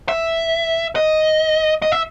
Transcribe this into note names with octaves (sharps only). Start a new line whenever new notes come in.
E5
D#5
D#5
E5